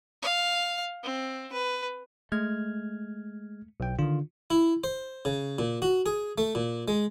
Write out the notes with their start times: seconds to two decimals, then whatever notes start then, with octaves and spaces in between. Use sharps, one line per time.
0.22 F5
1.03 C4
1.52 B4
2.32 G#3 A3 F6 G#6
3.80 B1 G5
3.99 D3 D#3 F4
4.50 E4
4.84 C5
5.25 C#3
5.59 A#2
5.82 F#4
6.06 G#4
6.38 A3
6.55 A#2
6.88 G#3